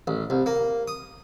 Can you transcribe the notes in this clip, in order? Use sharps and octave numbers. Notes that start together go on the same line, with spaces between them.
A1
C2
A#3
D#6